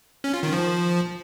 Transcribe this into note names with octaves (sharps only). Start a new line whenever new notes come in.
C#4
F4
D#3
F3